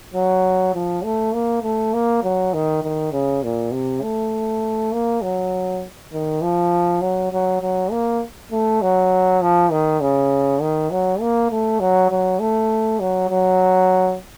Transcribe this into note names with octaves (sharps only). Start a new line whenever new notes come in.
F#3
F3
A3
A#3
A3
A#3
F#3
D#3
D#3
C#3
A#2
C3
A3
A#3
F#3
D#3
F3
F#3
F#3
F#3
A#3
A3
F#3
F3
D#3
C#3
D#3
F#3
A#3
A3
F#3
F#3
A3
F#3
F#3